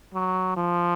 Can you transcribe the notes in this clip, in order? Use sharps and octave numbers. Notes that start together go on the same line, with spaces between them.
F#3
F3